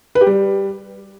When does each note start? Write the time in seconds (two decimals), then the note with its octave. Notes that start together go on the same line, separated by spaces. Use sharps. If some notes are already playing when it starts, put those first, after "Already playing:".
0.15 B4
0.21 G4
0.27 G3